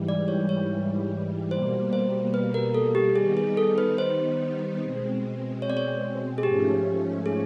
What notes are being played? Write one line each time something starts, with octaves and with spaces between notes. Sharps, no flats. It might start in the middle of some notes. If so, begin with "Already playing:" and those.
Already playing: G#2 E3 G3
D5
C#5
C#5
B2 G3 A#3 C5
C5
B4
A#4
A4
G4
D#3 G3 B3 D#4 G#4
G#4
A4
B4
C5
B2 G#3 C4
C#5
D5
C#5
G#4
G#2 F3 A3 C#4 G4
G#4